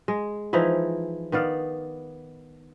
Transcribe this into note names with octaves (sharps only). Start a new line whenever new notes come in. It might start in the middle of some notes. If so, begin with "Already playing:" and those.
G#3
E3 F3 D#4 E4
D#3 B3 D5 F5